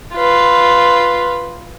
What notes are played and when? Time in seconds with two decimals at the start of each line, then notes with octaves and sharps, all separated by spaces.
0.13 F4 B4